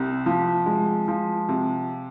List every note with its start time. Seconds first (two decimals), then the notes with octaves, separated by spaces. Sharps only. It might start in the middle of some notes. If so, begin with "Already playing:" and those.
Already playing: C2 C3
0.26 F3
0.66 G#3
1.08 F3
1.49 C3